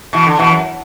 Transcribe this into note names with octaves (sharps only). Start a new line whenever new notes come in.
B2 E3
D3
B2 E3
F#2